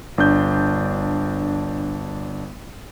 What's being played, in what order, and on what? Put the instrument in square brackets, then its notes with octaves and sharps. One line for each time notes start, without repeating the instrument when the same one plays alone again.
[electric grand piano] G1 D4 G6